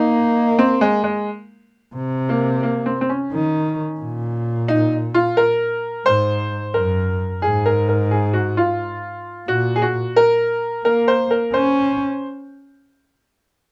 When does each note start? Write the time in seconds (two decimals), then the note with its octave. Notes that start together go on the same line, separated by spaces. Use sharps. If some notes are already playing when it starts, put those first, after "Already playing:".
Already playing: A#3 D#4
0.59 C4
0.81 G#3
1.04 G#3
1.95 C3
2.29 A#3
2.63 A#3
2.86 C4
3.01 C4
3.09 C#4
3.32 D#3
4.00 A#2
4.68 D#4
5.14 F4
5.37 A#4
6.06 G#2 C5
6.74 F#2 A#4
7.42 G#2 G#4
7.66 A#4
7.89 A#4
8.11 G#4
8.33 F#4
8.57 F4
9.48 A#2 F#4
9.76 G#4
9.82 F#4
10.16 A#4
10.85 A#3 A#4
11.08 C5
11.31 A#4
11.54 C#4 C5